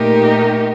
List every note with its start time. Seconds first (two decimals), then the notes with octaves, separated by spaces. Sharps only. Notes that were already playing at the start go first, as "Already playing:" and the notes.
Already playing: A#2 A3 D#4 G4 A#4